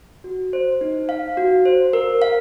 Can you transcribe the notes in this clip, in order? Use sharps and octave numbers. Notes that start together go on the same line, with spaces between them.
F#4
C5
D#4
F5
F#4
C5
A#4
F5